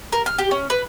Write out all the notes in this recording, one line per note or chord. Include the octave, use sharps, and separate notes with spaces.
A#4
F6
G4
C#4
B4